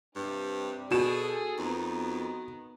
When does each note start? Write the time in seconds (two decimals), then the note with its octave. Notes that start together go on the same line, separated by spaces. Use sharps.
0.16 G2 C3 G3
0.91 B2 F#4 G#4 A4 E7
1.59 F2 D#3 B3